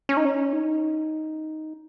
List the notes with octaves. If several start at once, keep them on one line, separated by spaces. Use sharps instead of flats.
C#4
D#4
C#4
D#4